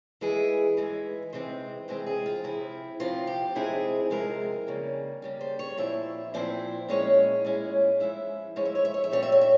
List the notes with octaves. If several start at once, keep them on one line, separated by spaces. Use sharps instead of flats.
E3 G#3 E4 G#4
E3 G#3 E4
C3 E3 G#3 C4 C5
C3 E3 G#3 C4 C5
G#4
F4
C3 F3 C4 E4
C3 F3 C4 F4
G4
C3 F3 G#3 C4 E4 G#4
C3 F3 G#3 C4 E4 A#4
C#3 G3 A#3
C#3 G3 A#3
C5
C#5
A#2 F3 C4 E4 E5
A#2 F3 C4 E4 C5
A#2 G#3 C#4 E4 C#5
A#2 G#3 C#4 E4
F3 G#3 E4 E5
F3 G#3 E4 C#5
E5
C#5
E5
C#5
E5
A#2 G3 C4 C#5
E5
C#5
E5